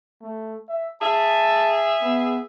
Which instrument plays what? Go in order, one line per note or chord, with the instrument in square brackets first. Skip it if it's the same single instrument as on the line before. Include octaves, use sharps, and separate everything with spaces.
[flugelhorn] A3
E5
[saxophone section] G#4 E5 [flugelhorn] A5
[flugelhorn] B3